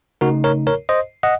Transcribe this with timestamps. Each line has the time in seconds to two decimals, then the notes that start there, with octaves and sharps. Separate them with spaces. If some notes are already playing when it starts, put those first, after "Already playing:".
0.21 C#3 A3 D#4 F#4 A#4
0.44 A#4 C#5
0.67 A#4 C#5
0.89 C5 D#5
1.23 D#5 F#5